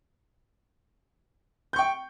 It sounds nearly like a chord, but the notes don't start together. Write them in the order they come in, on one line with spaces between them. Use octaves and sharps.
G6 C#6 G5